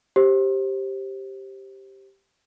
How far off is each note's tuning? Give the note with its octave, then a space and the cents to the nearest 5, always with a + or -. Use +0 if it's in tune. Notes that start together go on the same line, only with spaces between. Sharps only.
G4 +0 C5 +25